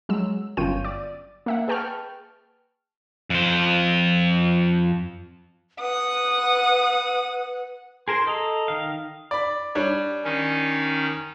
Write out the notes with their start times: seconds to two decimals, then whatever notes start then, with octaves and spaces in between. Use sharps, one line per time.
0.09 F#3 G#3 E6
0.57 G1 F#2 F4 C#5 G5 D#7
0.84 D5
1.46 A#3 E5 F#5
1.68 G#4 B4 G5 A5 C#6 F6
3.30 F2 C5
5.81 B4 F#5 D#6
8.08 G#4 A#4 C5 C6
8.27 A4 D#5 A#5
8.68 D#3 F5
9.31 D5 B5
9.75 G3 D4 C#5
10.24 D#3 C#4 D#4